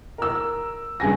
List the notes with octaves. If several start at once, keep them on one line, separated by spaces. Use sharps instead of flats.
A#4 E6
G2 C#3 G#5 A#6